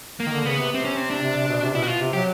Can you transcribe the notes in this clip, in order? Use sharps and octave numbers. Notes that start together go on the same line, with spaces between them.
A#3
D#3
D3
C#3 B3
C3
C3 C4
C#4
C4
D4
C3
C3
B2
C3
B2 E4
F#4
F4
C3
F#3 G4